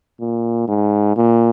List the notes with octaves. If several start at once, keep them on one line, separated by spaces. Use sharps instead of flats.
A#2
G#2
A#2